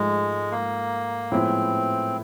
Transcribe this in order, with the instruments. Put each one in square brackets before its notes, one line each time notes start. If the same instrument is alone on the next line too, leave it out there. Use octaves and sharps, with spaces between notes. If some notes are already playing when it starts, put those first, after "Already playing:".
Already playing: [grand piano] G#2 F3 A3 [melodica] G#3
[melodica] A#3
[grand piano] A2 F3 G#3 B3 E4 [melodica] C4